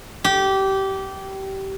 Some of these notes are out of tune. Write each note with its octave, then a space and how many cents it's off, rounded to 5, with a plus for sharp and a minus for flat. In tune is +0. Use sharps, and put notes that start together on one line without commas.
G4 -20